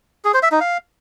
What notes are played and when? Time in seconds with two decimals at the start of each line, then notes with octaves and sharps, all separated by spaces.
0.25 G#4
0.34 C5
0.43 E5
0.52 D#4
0.61 F5